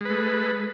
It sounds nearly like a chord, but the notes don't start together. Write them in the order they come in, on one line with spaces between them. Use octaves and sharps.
G#3 B4 A3